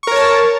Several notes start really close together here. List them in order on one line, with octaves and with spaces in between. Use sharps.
C#6 A#4 C#5 A5